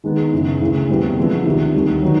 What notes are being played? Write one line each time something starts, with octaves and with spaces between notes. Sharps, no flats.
D#3 G#3 B3 D#4
F#2 C#3 E3
D2 C#3 E3
E2 B2 G3 C4
D3 F3 G#3 B3 E4
D2 C3 D#3
D#2 D3 G3
D#3 F#3 B3 D#4